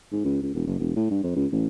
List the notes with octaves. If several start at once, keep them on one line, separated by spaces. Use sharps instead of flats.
G#2
C#2
C#2
E1
F#1
E1
A2
G2
F2
C#2
A1